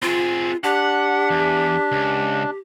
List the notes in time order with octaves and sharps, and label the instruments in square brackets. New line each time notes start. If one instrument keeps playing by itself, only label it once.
[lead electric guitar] C4 G#4 [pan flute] F4
[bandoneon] D4 [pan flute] G4 [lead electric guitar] F#5
[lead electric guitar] E2
C#2